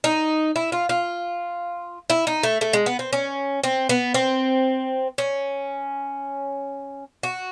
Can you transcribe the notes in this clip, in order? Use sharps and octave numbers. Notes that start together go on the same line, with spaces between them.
D#4
E4
F4
F4
E4
D#4
A3
A3
G#3
B3
C4
C#4
C4
B3
C4
C#4
F#4